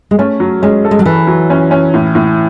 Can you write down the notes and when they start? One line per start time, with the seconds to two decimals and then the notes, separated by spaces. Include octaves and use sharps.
0.11 G#3
0.19 A3 C#4
0.40 F#3
0.62 G#3 C#4
0.85 A4
0.91 G#3
0.99 F#3
1.06 E3 A4
1.27 F#3
1.50 C#4
1.71 C#4
1.94 A2
2.15 A2